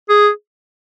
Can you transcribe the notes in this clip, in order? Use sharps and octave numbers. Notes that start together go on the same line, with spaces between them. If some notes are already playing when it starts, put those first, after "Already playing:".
G#4